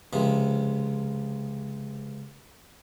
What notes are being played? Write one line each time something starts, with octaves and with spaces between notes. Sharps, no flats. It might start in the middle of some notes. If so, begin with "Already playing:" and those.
C#2 C3 F3